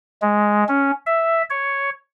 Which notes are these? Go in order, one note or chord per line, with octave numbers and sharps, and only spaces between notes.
G#3
C#4
E5
C#5